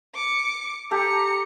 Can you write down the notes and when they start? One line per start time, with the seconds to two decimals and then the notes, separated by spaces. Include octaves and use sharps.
0.14 D6 C#7
0.91 G4 A4 A#5 C#7